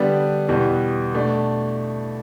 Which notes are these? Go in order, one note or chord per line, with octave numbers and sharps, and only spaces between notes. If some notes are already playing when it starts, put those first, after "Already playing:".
Already playing: D3 G3 B3 D4
E2 B2 G3 B3
B2 A3 D4